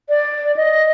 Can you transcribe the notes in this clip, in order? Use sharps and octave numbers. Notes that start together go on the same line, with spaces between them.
D5
D#5